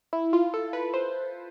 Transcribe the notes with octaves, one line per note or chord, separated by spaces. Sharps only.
E4
F4
A4
B4
C5